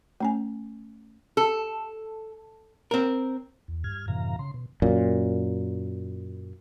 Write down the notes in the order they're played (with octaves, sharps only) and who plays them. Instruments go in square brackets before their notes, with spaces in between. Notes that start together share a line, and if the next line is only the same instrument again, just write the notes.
[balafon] A3 C#4 G#5
[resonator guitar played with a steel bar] A4
[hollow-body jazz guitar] C4 A#4
[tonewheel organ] E2
G2 F6 G#6
F#2 A2 C3 E3 F5 A#5
C#3 C6
B2
[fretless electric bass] F#2 A#2